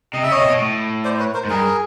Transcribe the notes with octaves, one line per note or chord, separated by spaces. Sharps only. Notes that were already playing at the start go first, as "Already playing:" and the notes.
C3 D#5
C#3 E5
C#5 D#5
C3
B2
A2
C5 D5
B4 C#5
A#4 C5
G#2
G2 G#4 A#4